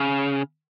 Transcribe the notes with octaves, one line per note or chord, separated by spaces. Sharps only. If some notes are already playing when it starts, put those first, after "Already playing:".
Already playing: C#3